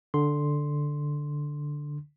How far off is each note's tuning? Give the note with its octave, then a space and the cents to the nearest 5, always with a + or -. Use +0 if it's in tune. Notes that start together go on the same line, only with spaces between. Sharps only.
D3 +0 C6 +0